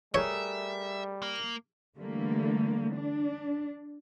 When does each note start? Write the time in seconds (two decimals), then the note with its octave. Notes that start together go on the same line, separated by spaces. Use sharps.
0.14 G3 A3 G#4 A#4 C#5 E5
1.22 A#3
1.97 D3 E3 G3 A3 A#3
2.94 D4